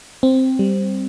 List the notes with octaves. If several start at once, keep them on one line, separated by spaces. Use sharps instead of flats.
C4
G3